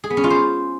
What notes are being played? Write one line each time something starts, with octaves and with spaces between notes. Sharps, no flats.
G#4
B3
C#4
F4
C5